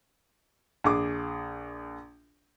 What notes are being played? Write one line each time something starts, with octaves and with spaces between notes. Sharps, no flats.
A#1 G#4 D6